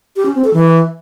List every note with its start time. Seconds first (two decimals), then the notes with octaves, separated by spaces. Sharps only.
0.16 G4
0.26 C#4
0.35 C4
0.44 A4
0.54 E3